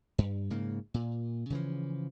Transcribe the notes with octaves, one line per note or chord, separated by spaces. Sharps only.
G2
G#2 C#3 A#3
A#2
C#3 E3 F3